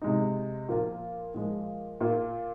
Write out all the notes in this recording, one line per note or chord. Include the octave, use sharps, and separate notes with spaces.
C3 G#3 D#4
A#2 F3 A#3 F4
A#2 F3 G#3
A#2 A#3 F4